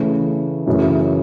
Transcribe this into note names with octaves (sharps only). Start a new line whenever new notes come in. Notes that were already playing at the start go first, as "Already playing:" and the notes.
Already playing: C#3 E3 A3
F#2 C#3 E3 A3 E4